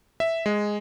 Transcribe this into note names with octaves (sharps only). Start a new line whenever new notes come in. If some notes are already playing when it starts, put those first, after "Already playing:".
E5
G#3